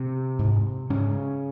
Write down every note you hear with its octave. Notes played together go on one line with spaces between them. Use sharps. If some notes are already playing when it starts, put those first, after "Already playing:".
Already playing: C3 C4
G#2
G#2 C#3 C#4